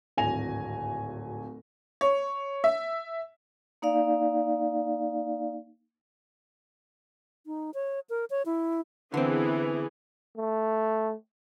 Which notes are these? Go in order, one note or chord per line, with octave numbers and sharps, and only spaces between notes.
D1 G#1 G#5 A#6 F7
C#5
E5
A#3 D#4 D5 F5
D#4
C#5
A#4
C#5
E4
D3 E3 B3 C4 G#4
A3